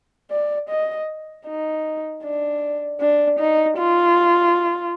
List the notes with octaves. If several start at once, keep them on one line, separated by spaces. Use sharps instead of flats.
D5
D#5
D#4
D4
D4
D#4
F4